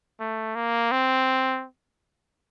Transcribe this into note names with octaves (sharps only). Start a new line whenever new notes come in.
A3
A#3
C4